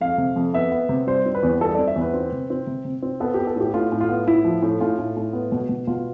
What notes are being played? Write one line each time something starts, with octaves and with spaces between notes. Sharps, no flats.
F2 F5
C3
F2
B3 E5
B3
C3
G3 C5
C4
B4
E2
G3 A4
C4 D5
E5
E2
B4
C4
C3
C4
C3
C3
C4
B3 A4
G4
B3
A4
A2 G4
A2 F4
A2
F4
B3
A2 E4
F3
A2
A2 F4
A2
A2
B3
B2
B2
B2 F4